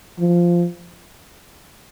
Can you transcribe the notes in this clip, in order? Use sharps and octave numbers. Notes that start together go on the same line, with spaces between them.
F3